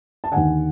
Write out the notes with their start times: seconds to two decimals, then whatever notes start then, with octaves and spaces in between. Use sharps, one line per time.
0.24 A5
0.32 D#2 D3 F#5 G#5